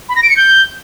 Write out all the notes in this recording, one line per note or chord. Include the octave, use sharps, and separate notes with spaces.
B5
A#6
D7
C#7
G6